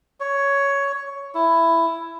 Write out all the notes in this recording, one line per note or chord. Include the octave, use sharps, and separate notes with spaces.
C#5
E4